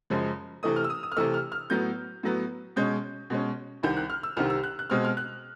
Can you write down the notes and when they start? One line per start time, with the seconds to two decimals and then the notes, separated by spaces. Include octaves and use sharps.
0.10 F#2 C#3 F3 G#3
0.63 C3 E3 A3 D#6
0.76 F6
0.84 E6
0.90 D#6
1.03 D#6
1.12 F6
1.16 C3 E3 A3 E6
1.34 F6
1.52 F6
1.70 A2 F#3 B3 G6
2.23 A2 F#3 B3
2.76 B2 G#3 C#4 G6
3.30 B2 G#3 C#4
3.83 C2 C3 D#3 G6
3.97 F#6
4.10 F6
4.23 E6
4.37 C2 C3 D#3 F6
4.50 E6
4.64 F#6
4.79 F#6
4.90 B2 G#3 C4 F6
5.05 F6
5.17 F#6